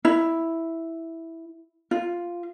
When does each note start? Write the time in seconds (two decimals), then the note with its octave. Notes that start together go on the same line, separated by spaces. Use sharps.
0.05 E4
1.91 F4